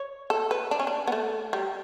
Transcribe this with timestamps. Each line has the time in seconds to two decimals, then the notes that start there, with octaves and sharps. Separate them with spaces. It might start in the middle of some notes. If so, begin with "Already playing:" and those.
Already playing: C#5
0.30 A4
0.51 B4
0.71 D4
0.79 C#4
0.87 D4
1.07 B3
1.12 A3
1.53 G3